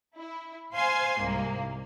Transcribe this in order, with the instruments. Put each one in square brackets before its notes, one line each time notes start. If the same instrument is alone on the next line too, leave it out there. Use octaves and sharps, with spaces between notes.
[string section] E4
C5 F5 G#5 C6
C2 G#2 A#3